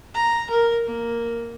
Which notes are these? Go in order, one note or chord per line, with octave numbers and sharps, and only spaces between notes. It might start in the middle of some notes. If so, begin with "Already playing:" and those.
A#5
A#4
A#3